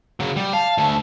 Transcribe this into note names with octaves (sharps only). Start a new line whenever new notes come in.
C#3 F#3
G3
F5 A5
D2 A3